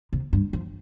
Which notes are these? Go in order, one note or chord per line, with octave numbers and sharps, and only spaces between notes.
C3
G2
F3